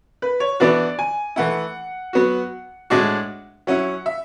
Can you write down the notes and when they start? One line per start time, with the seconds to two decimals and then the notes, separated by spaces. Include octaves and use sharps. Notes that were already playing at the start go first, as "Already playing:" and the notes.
0.22 B4
0.40 C#5
0.60 E3 B3 D4 F#4 D5
0.99 G#5
1.36 E3 A3 E4 F#5
2.13 F#3 B3 F#4
2.90 A2 G#3 D4 F#4
3.67 F#3 C#4 E4 F#5
4.06 E5